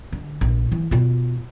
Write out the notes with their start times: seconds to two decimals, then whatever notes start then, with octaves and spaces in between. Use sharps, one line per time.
0.12 D3
0.41 A#1
0.72 E3
0.91 B2 F4